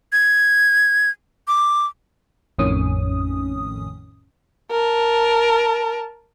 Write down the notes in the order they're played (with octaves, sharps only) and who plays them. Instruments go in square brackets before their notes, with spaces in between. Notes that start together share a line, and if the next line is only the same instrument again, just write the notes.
[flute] G#6
D6
[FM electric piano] A1 F2 A2 D#3 C#4 D#6
[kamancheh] A#4 A5